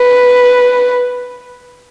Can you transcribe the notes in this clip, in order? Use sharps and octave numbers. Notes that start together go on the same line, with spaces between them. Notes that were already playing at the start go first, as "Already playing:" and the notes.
Already playing: B4